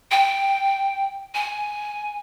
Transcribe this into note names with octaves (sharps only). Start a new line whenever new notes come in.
G5
G#5